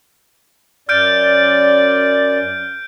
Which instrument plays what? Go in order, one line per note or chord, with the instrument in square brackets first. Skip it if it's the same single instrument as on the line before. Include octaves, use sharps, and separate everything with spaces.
[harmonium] F#2 D5 [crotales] F6 G6 D7